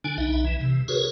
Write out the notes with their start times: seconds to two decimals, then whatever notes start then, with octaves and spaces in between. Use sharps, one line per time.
0.04 D3 D4 G#5
0.18 B1 D#4 E5
0.45 E3
0.61 C3
0.88 F#4 G#4 A#4 B4 C#5